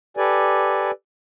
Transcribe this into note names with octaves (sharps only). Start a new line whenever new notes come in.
G4 A4 B4 D5 G#5